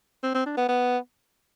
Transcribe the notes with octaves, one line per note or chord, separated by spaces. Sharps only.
C4
C4
D4
B3
B3